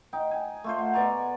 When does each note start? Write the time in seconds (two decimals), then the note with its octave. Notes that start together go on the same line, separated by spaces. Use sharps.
0.13 D#4 G5
0.31 G#5
0.64 A3 F4 C5
0.79 F#5
0.93 B2 D5 G#5 A#5